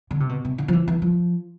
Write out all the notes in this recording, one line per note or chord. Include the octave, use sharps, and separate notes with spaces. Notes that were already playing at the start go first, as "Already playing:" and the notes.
D3
C3
B2
C3
D3
F3
E3
E3
F3